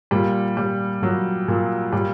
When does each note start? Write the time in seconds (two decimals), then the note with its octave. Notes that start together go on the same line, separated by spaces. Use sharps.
0.11 A#2 G3
0.57 A#2 G3
1.02 A#2 F#3
1.48 A#2
1.92 A#2 G3